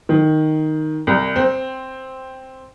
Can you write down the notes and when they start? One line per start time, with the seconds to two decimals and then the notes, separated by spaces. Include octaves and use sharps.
0.09 D#3
1.07 C2
1.36 C4